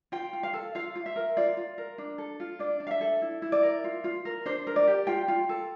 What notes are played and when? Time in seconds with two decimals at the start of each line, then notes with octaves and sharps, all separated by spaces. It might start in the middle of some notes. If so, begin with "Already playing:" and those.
0.12 F4 G5
0.33 F4
0.43 F5
0.53 A4
0.75 F4 F5
0.95 F4
1.06 E5
1.16 A#4
1.37 F4 D5
1.57 F4
1.78 A#4
1.98 D4
2.18 A4
2.40 F4
2.59 D4 D5
2.80 D4
2.87 F5
2.91 E5
3.01 A4
3.22 E4
3.42 E4
3.52 D5
3.63 A#4
3.84 F4
4.04 F4
4.25 A#4
4.46 D4 C5
4.67 A#4
4.76 D5
4.87 G4
5.07 F4 G5
5.28 F4
5.49 A4